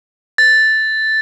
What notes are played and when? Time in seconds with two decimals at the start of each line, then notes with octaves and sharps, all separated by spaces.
0.38 A6